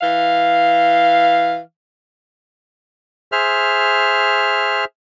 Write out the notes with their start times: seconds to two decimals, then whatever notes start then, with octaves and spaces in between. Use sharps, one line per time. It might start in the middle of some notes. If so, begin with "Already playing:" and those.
0.02 E3 F5
3.32 G#4 C5 E5 F6